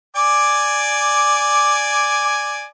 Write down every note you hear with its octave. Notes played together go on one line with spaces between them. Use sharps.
D5 G#5 D6